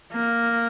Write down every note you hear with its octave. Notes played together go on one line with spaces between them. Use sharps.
A#3